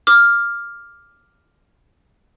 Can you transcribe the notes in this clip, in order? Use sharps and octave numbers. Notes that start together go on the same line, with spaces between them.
D6 F6